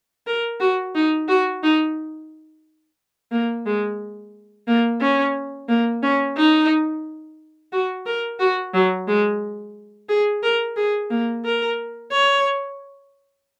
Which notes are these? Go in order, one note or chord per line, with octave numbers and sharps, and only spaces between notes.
A#4
F#4
D#4
F#4
D#4
A#3
G#3
A#3
C#4
A#3
C#4
D#4
F#4
A#4
F#4
F#3
G#3
G#4
A#4
G#4
A#3
A#4
C#5